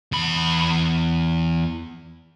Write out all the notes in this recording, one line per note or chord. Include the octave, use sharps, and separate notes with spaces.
E2 B5